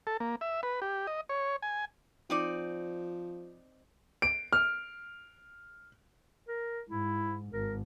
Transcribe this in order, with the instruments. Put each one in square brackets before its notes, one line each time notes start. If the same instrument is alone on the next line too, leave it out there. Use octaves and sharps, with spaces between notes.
[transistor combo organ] A4
A#3
E5
B4
G4
D#5
C#5
G#5
[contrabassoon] F3 [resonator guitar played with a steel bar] C4 D#4 D5
[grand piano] D7
F6
[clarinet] A#4
[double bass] G#2 [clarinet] E4
[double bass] G#1 [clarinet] A#4